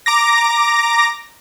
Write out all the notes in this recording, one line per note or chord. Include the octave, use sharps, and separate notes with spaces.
A#5 D6 A#6